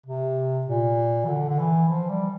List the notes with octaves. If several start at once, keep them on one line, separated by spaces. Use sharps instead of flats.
C3
A#2
E3
D3
D3
E3
F3
G3